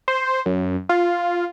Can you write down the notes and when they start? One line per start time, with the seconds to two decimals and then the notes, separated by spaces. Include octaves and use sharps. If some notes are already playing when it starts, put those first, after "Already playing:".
0.08 C5
0.46 F#2
0.89 F4